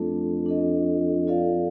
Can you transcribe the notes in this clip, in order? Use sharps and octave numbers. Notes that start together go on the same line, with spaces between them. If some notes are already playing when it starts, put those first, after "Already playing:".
Already playing: F2 A3 D4 A4
D4 A4 D#5
F4 A4 D5 F5